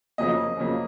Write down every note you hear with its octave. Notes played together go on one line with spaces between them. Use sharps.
F2 C#3 F#3 A#3 D#5
F2 C#3 F#3 A#3